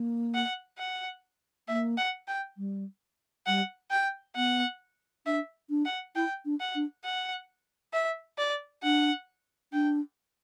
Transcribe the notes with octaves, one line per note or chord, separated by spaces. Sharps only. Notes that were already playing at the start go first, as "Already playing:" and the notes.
Already playing: A#3
F#5
F#5
A#3 E5
F#5
G5
G3
G3 F#5
G5
B3 F#5
D4 E5
D4
F#5
E4 G5
D4
F#5
D4
F#5
E5
D5
D4 F#5
D4 G5